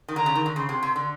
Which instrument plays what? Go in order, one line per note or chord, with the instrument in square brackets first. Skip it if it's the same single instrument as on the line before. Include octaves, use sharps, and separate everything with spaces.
[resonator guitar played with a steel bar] D#3
[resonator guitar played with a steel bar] D3 [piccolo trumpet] A#5
[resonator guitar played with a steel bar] C#3
D#3
D3
[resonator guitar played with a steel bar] C#3 [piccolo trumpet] C6
[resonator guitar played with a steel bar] C3
C3
D3